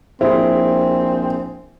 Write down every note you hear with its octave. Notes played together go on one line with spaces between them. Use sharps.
A#1 C4 E4 G#4 C5